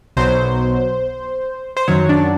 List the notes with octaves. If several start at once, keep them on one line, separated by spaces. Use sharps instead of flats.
B1 B2 F#3 C5
C5
F#2 D#3 F#3 C#5
D4 D5